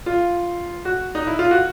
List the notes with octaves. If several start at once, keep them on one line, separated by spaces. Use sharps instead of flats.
F4
F#4
D#4
E4
F4
F#4